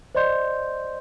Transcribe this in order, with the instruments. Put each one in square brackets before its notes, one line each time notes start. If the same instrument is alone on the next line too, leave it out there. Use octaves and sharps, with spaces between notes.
[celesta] C5 D5 D#5 C6 G6